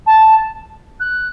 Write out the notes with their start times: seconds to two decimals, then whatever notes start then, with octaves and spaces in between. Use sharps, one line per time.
0.06 A5
0.99 F#6